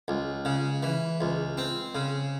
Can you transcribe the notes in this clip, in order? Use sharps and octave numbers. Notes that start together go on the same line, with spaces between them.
C#2
C#3
E3
C#2
C4
C#3